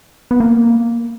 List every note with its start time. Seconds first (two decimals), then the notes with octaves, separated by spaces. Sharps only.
0.31 B3
0.40 A#3